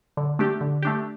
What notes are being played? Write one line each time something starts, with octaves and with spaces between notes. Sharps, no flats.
D3
A3 D4 G4
D3
A3 D4 G4